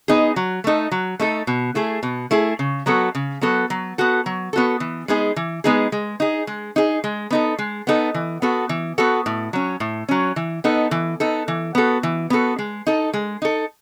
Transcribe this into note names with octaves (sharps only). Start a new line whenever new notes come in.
B3 D#4 G#4
F#3
A3 D#4 A4
F#3
A3 D#4 A4
B2
A3 E4 G#4
B2
A3 E4 G#4
C#3
F#3 B3 F#4 A4
C#3
F#3 B3 F#4 A4
F#3
B3 F#4 A4
F#3
B3 F#4 A4
E3
G#3 B3 D#4 G#4
E3
G#3 B3 D#4 G#4
G#3
D#4 G#4
G#3
D#4 G#4
G#3
B3 D#4 A4
G#3
B3 D#4 A4
E3
B3 F#4 A4
E3
B3 F#4 A4
A2
F#3 C#4
A2
F#3 C#4
E3
B3 D#4 A4
E3
B3 D#4 A4
E3
B3 F#4 A4
E3
B3 F#4 A4
G#3
D#4 A4
G#3
D#4 A4